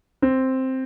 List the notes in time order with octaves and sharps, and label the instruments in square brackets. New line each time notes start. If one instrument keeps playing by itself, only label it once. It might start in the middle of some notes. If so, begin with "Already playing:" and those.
[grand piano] C4